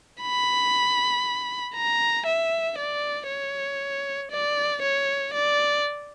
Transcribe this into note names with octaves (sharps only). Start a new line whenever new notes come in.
B5
A#5
E5
D5
C#5
D5
C#5
D5